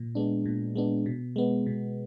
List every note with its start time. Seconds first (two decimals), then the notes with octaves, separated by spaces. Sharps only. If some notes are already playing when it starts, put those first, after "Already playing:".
Already playing: A#2
0.15 G#3 B3 D4
0.45 A#2
0.75 G#3 B3 D4
1.06 B2
1.36 G#3 B3
1.66 B2